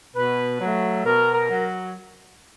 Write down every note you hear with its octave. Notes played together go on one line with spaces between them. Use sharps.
B2 B4
F#3 A3
B2 A#4
A#4
F#3